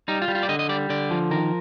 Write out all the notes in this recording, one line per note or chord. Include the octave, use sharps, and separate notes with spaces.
G3 D#4
F4
G3
F4
D5
D3 D#5
D#5
G3 D5
D3 D5
F3
D#3 A#4